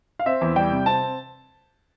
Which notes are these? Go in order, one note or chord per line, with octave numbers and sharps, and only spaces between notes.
F5
C4 E5
E2
G3 G5
C3
C4 A5